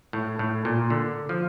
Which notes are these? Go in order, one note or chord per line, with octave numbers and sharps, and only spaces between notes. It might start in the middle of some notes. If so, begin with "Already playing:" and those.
A2
A2
A#2
D3
F3